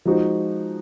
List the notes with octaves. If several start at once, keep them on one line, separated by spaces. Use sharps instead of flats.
F3 G#3 D#4 F#4 C5